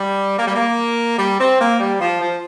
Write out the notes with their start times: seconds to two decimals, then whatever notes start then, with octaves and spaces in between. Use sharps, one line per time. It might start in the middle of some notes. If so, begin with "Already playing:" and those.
Already playing: G3
0.37 A#3
0.47 G3
0.55 A#3
1.18 G3
1.40 C4
1.60 A#3
1.80 G3
2.00 F3
2.22 F3